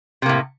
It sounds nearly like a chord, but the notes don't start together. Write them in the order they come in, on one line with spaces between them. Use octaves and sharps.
C3 A#3 A2